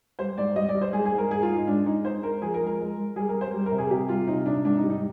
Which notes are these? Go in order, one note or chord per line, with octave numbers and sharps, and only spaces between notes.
G3 C5
G#2 D5
G3 D#5
D5
G3
C5
G#2 G#4
G#4
G#2
A#4
G#2 G#4
F4
G#2
D#4
G#3 D4
G#3 D#4
G#3 C5
G#3 A#4
F3 G#4
A#4
G#3
A#4
G#3
G#3
G3 G#4
A#4
G3
C5
G3
A#4
C3
G#4
C3 G4
G3 F4
C3 D#4
C3 D4
G#2 D4
D#4
G3
D#4